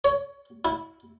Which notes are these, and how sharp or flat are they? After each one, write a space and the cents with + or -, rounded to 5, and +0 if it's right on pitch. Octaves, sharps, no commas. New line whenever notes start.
C#5 +10
E4 -20